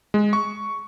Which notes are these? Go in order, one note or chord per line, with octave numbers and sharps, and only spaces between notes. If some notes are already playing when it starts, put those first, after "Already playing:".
G#3
C#6